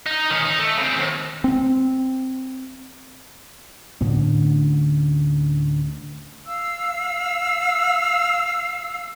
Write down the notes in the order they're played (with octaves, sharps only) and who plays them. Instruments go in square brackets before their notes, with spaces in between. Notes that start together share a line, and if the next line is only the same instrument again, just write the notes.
[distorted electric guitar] D#4
D#3 C#4
D#4
A3
C#3 C4
D#2
[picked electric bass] C4
[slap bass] D2 A2 D3 C#4
[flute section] F5 E6